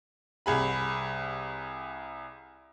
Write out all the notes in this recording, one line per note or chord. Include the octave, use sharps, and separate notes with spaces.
C2 G#4 B5